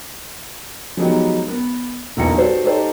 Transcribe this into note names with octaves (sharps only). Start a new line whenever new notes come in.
F3 F#3 G#3 B3 D#4 G4
B3
E1 B1 E2 A#2 A#5 C#7
F#4 G4 A4 B4 C5 D5
A3 D#4 G4 A4 C5